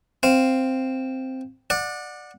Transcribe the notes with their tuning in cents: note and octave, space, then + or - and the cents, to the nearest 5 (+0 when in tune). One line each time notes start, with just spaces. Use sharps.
C4 +0 F5 +0
D5 +20 F#5 -20